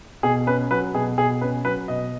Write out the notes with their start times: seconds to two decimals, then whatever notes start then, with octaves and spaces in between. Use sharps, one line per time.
0.23 B2 G#4
0.47 C#4 B4
0.71 F#3 B4
0.94 B2 G#4
1.18 B2 G#4
1.41 C#4 B4
1.65 F#3 B4
1.88 B2 D#5